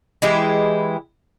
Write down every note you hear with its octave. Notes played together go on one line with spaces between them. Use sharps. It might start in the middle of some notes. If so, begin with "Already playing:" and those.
E3 G#3 E4 G4